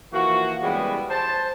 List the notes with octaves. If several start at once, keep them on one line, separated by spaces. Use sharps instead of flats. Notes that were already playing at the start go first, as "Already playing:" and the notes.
E3 F3 A#3 F#4
C#3 E3 G3 G#3 B3
C5 A5